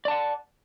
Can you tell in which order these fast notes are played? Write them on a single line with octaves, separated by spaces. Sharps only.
D5 A5 F#5